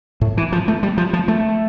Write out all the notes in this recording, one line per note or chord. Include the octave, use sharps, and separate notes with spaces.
A2
E3
F3
A3
G3
F3
F3
A3